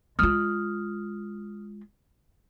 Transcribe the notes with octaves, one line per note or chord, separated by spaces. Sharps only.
G#3 F4 D#6 F6